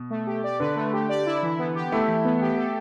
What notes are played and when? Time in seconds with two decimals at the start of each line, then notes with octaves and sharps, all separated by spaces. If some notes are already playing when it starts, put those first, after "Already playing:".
Already playing: B2
0.10 A3
0.27 G4
0.44 D5
0.59 D3 B4
0.76 A3
0.93 G4
1.09 D5
1.26 E4
1.43 E3
1.59 B3
1.75 G4
1.92 A3 E4
2.08 E3
2.25 B3
2.41 G4
2.57 A4